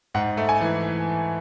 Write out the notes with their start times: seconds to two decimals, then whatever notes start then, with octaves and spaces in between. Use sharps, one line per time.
0.14 G#2 F#5
0.37 A3
0.49 G#5
0.61 E3